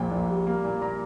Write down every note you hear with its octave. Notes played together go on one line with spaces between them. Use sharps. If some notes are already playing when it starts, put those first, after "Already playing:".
Already playing: A#1 A#2 G5
A#1
G3
A#3
A#2
A#2 A#5